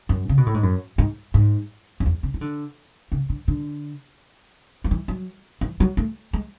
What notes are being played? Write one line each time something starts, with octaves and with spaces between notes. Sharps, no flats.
F#2
C#3
B2
A2
G#2
F#2
G#2
G#2
F#2
E2
C#3
E3
D3
C#3
D3
D3
F#3
E3
F#3
E3
F#3
A3
G#3